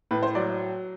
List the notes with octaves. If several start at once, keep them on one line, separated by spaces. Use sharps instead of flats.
A2 B4
C5
F#3 D5